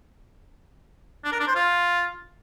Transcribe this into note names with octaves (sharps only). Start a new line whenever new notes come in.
D4
A#4
D4
C5
F4